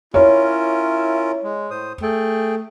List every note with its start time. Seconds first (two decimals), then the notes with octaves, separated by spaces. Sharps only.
0.14 C#4 E4 F4 A#4 C#5
1.43 G#3
1.71 A2 C5 D#6
2.02 A3 G#4 G5